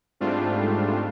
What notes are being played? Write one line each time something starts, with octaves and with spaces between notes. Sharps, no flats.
G#2 G3 A3 C4 D4 F4